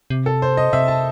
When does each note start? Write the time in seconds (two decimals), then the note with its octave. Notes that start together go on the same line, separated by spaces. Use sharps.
0.10 C3
0.26 A4
0.42 C5
0.57 D#5
0.73 C3 E5
0.88 A5